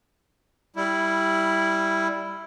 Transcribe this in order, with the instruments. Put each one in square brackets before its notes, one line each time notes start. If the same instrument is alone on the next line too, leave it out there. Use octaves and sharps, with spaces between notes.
[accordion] G3 E4